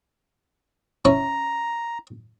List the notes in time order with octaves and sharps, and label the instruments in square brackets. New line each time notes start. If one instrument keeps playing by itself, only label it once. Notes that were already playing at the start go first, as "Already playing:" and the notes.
[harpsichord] C#4 E4 A5 [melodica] A#5